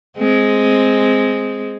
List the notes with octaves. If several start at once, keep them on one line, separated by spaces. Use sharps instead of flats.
G#3 C4